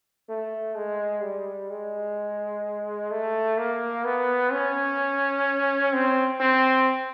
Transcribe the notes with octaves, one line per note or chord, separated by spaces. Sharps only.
A3
G#3
G3
G#3
A3
A#3
B3
C#4
C4
C4